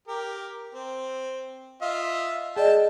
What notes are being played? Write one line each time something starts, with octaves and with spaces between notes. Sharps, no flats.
G4 A#4
C4
F4 D#5 E5
G#4 D5 D#5 G5 A5